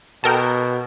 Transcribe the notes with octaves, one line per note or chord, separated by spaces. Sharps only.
B2 A4 A#4 G5